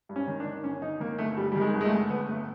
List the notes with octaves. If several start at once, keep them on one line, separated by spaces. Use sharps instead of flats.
G2
C#4
D#3
D4
D#3
G1 C#4
G1 D#4
D#3 A#3
G1 A3
G1 G3
D#3 G3
G#3
G1
G#3
A3
G1
G1 B3
G1 A3